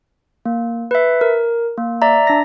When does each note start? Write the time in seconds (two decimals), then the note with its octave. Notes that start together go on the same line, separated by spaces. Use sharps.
0.46 A#3
0.91 B4 E5
1.21 A#4
1.77 A#3
2.02 D5 E5 A#5
2.27 D4 A#6